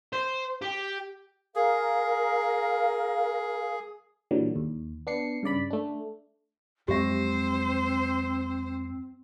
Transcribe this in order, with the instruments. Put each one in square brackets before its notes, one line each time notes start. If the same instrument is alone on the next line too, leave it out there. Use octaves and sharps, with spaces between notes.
[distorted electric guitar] C5
G4
[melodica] G#4 [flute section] A#4 F5
[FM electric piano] A#2 D3 E3 F#3 G3
D#2
B3 D4 C7 C#7
G2 C#3 D5 B5
A3 D4
[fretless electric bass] F2 F#3 G#3 [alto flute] C4 [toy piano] G4 E5 [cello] C5